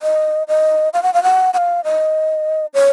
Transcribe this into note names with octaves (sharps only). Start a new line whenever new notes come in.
D#5
D#5
F5
F#5
F5
F#5
F#5
F5
D#5
C#5